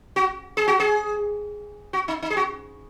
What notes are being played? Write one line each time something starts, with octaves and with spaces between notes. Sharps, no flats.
F#4
G#4
F#4
G#4
F#4
D#4
D#4
G#4
F#4